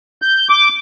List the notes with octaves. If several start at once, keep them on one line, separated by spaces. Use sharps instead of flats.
G6
D6